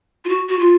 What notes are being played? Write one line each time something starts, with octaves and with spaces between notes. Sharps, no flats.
F4
F#4
F#4
F4